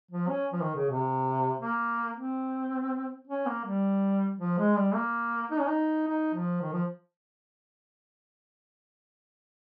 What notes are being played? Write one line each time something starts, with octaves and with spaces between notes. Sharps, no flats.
F3
C#4
F3
D#3
C#3
C3
A#3
C4
C#4
A#3
G3
F3
G#3
G3
A#3
D#4
C#4
D#4
D#4
F3
D#3
F3